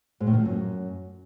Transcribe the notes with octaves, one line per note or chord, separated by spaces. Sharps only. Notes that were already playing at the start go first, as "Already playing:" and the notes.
G#2
A2
D#3
F3
F#2